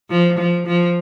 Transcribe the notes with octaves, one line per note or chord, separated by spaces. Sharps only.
F3
F3
F3